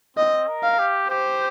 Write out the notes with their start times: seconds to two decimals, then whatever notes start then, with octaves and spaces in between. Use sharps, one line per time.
0.17 C4 D#5
0.48 A#4
0.63 F5
0.79 G4
1.09 G4 C5